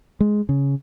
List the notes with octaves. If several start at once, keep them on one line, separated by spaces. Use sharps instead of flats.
G#3
C#3